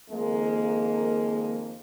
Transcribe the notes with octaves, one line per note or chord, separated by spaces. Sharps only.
F2 D#3 G#3 A#3